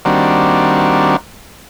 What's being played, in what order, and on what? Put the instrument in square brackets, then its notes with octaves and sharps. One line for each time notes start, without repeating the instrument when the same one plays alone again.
[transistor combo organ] D#3 G3 A#3 C4 D4 F#4